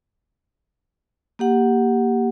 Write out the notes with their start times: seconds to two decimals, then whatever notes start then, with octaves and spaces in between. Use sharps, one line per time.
1.39 A#3 G4 F#5